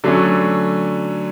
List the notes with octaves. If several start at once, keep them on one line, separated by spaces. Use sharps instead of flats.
D3 F#3 A3 C#4